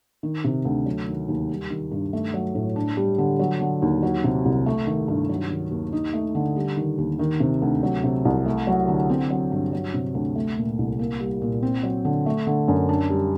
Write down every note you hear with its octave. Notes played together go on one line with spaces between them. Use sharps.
D#3
C3
D2
F#3
D#3
D#2
G3
D#3
G2
A3
F#3
A2
D4
G3
D3
F#3
D3
D#2
F#3
C3
C2
A3
D#3
G2
F#3
D#3
D#2
D#4
A3
D3
G3
D#3
D#2
D#3
C3
D2
F#3
C3
C2
A3
F#3
D3
C4
F#3
G2
F#3
C3
D2
A3
A#2
C2
A#3
G3
A#2
C4
F#3
D3
A3
D3
F#2
D4
G3